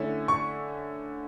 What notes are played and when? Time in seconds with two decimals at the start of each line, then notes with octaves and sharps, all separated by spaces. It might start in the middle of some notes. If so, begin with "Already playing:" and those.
Already playing: D3 A3 C#4 E4
0.28 C#6